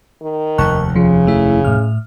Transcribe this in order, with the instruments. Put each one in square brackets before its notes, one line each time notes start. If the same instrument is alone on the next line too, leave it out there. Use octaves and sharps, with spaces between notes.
[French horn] D#3
[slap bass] F1 D#2 [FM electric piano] A5 C#6 F#6
[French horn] C#3 [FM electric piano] F3
[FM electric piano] A3 E4
A2 F6